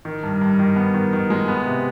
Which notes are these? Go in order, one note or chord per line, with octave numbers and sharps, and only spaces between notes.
D#3
G2
G2
D#3
B3
D#3
D#3
G#3
B3
C3